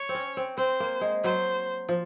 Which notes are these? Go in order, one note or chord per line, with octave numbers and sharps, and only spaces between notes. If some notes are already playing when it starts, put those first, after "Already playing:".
Already playing: C#5
C4
C#4
C4
C4 C5
A#3
G#3
F#3 C5
F3